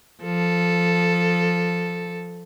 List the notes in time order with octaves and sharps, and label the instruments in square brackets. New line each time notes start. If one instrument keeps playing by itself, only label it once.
[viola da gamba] F3 A4